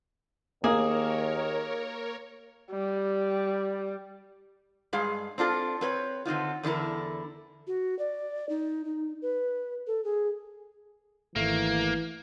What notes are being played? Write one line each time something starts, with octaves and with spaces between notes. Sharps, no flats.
D#2 A#3 G#4 A#4 C#5
G3
G2 G#3 G#4 F5
C4 D4 F4 A4
C4 B4 C#5
D3 C4 D#4 F4
E2 D3 E4 A4 A#4
F#4
D5
D#4
D#4
B4
A4
G#4
G#1 E3 A3 A#3